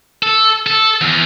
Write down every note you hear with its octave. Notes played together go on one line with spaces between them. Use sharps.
A4
A4
E2